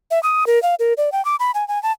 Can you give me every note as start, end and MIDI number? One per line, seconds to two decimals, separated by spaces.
0.11 0.21 76
0.23 0.46 87
0.47 0.61 70
0.63 0.75 77
0.79 0.93 70
0.97 1.12 74
1.12 1.23 79
1.25 1.36 86
1.40 1.51 83
1.54 1.66 80
1.68 1.81 80
1.83 1.92 81